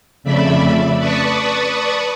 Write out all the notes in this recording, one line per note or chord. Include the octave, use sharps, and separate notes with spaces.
F2 C#3 A3 D5 E5 B5
B4 D5 A5 B5 C#6 D#6